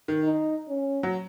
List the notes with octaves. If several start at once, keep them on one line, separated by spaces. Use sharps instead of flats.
D#3
D#4
C#4
F#3